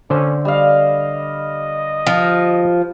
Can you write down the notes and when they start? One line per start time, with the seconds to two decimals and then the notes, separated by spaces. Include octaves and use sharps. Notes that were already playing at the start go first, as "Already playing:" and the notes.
0.10 D3 C#4 C5
0.45 G3 D#5 F5
2.07 F3